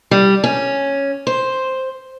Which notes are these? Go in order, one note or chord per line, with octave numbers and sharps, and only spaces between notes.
G3
C#4
C5